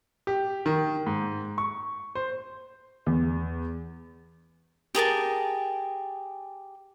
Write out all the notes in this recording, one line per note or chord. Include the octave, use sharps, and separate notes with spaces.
G4
D#3
G#2
C#6
C5
E2
G4 G#4 A#4 A5